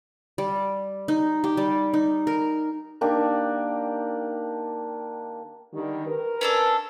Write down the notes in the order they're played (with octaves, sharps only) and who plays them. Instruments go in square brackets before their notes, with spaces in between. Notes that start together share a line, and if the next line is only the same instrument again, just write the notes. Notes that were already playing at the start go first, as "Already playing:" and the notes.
[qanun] G3
D#4
G4
G3
D#4
A#4
[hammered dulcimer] D#3 A#3 D4 G4
[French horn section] D3 D#3 G3
A#4 B4
[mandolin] C#4 D4 A4